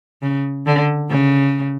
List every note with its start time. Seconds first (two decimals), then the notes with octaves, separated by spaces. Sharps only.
0.22 C#3
0.66 D3
1.10 C#3